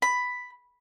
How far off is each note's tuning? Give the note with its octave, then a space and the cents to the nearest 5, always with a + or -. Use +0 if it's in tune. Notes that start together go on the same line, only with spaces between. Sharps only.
B5 +5